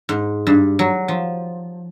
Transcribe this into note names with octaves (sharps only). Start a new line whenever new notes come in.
G#2
G2
F#3
F3